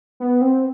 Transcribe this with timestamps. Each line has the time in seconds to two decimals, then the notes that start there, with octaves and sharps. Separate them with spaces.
0.20 B3
0.41 C4